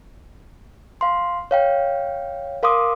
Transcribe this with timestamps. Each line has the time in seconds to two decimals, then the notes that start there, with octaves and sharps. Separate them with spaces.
1.01 F5 C6
1.51 C#5 F5 G5
2.63 A#4 F5 C6 D6 D#6